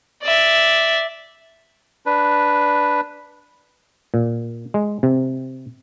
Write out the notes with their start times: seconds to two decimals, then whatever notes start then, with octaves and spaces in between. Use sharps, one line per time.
0.23 D5 E5
2.06 D4 B4
4.14 A#2
4.74 G#3
5.03 C3